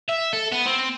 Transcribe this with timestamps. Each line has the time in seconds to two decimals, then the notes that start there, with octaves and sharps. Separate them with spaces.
0.08 E5
0.33 A4
0.52 B3
0.66 C4